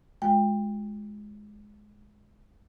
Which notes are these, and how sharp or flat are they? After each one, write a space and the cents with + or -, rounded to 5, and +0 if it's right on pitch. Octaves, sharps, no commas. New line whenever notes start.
G#3 +10 F4 +40 G5 +20